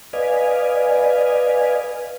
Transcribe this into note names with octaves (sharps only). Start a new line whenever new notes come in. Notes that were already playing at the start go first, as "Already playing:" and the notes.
B4 D5 D#5 F5 G#5